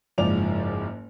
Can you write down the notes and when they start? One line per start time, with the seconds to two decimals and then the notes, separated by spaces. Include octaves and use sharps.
0.18 F#1 G#2 F3 D5 F7